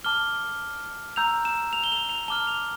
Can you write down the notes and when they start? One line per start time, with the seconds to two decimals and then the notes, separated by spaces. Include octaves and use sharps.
0.04 A5 D6 F6 G7
1.16 A#5 E6 G6 F7
1.45 E7
1.73 F7
1.84 G7
1.92 F7
2.09 F7
2.28 A5 D6 F6 G7
2.47 F7